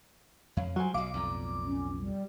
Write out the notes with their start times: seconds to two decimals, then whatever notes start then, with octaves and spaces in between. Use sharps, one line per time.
0.57 F2 C#5 F5
0.76 F#3 G3 F4 C5 G#5
0.94 B1 F#3 D#5 F5 D6
1.14 B1 F2 A2 D5 A#5
1.66 C#4
2.00 G3